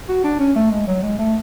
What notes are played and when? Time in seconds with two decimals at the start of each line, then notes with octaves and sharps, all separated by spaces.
0.09 F#4
0.24 D4
0.39 C#4
0.55 A3
0.71 G#3
0.87 F#3
1.02 G#3
1.19 A3